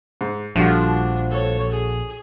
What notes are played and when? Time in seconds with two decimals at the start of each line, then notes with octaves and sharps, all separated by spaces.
0.21 G#2
0.56 A#1 G2 D3 F3 D4 F#4
1.30 A4 C#5
1.71 G#4